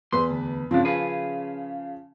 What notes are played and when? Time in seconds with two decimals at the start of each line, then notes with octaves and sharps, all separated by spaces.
0.13 E2 B4 C6
0.30 D2
0.71 C#3 F3 C4 D4
0.85 G#4 B4